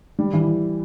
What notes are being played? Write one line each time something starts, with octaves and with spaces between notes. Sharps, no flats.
G3
E3